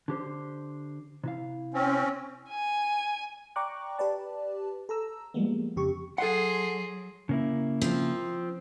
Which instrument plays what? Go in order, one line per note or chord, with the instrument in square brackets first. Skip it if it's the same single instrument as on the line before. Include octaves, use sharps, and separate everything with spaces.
[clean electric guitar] D3 G4 C5
C3 E4 F5
[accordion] C4 C#4
[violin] G#5
[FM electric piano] D5 G5 A#5 C#6 D6 F#6
G4 B4 D5 A5
A4 A#5 E6
F3 G3 G#3 A#3 B3
F2 C#3 G4 C#6
[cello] F#3 [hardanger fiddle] G#4 C6 [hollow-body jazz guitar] A4 F#5
[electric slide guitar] C#3 A#3 E4
[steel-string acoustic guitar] F3 C4